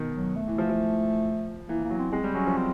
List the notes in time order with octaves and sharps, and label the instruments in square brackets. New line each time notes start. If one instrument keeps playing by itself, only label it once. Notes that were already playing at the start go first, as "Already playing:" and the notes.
Already playing: [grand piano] B2 D#3
[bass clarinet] F#3
A3
[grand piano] E3
F3
F3
[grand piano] E3 [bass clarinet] A#3
[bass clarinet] A#3
[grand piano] F#3
[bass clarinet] C4
[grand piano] G#3 [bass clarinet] C4
[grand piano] G3
[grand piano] F#3 [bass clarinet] C#4
[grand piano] F3
[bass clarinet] C4